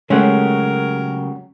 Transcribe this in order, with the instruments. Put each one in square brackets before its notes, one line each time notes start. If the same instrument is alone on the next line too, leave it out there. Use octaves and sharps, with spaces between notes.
[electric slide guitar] C#3 F#3 G4 [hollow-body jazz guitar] G#3 A3 [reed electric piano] C#4 F#5 [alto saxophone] A#4